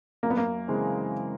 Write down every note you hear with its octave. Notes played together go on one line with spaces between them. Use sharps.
F#2 A#3
B3
A#3
C#3 E3 G#3 C4